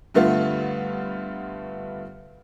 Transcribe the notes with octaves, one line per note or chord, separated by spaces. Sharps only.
G2 D3 A3 B3 F4